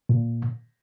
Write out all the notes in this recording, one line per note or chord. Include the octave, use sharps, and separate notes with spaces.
A#2